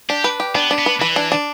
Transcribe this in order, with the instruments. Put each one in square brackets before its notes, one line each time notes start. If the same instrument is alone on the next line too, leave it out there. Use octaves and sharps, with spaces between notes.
[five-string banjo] D4 [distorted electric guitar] G4
[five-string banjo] B4
G4
[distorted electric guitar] B3 [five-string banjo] D4
[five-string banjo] D4
[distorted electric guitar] B3
[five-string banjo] B4
[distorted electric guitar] E3 [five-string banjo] B4
[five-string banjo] D4
D4